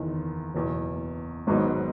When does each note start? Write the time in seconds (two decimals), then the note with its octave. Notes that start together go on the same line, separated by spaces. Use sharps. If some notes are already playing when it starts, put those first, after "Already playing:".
Already playing: F#1 E2 D#3
0.55 F#1 E2 B2
1.47 G#1 G#2 F#3 B3 D#4